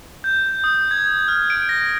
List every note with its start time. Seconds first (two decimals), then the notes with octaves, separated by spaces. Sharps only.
0.24 G6
0.64 D#6
0.91 G#6
1.28 F6
1.50 D7
1.69 A#6